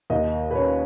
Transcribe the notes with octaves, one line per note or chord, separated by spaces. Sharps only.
D#2 D#5
B4
C#4 C#5